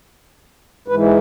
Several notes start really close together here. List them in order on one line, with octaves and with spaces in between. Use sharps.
G#2 B4 E3